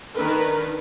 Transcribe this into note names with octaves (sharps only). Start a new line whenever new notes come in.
D#3 D4 A#4 B4